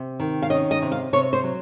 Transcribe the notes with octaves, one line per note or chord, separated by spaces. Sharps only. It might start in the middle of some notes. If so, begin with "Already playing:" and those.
Already playing: C3
D#3
F5
C#4 D#5
D#5
C3
F5
C3 C#5
C5
F#3